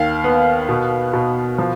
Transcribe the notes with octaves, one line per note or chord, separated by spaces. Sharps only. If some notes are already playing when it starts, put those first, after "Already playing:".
Already playing: D#2 F5
B3
B2
B2
F3